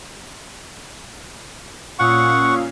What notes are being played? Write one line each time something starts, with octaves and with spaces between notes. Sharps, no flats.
A#2 C#4 F4 F5 F#5 C#6 D#6 E6